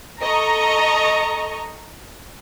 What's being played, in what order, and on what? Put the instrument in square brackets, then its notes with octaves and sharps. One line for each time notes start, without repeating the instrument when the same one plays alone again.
[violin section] A4 D#5 A#5 C#6